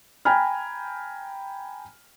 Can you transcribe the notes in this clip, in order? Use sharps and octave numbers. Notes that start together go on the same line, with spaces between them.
G5 G#5 A#5 B5 F6